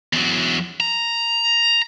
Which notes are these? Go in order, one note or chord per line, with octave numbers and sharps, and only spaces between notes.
E2 F#3
A#5